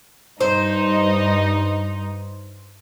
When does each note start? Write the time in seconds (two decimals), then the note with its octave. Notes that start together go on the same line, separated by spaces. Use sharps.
0.41 G2 D#4 C5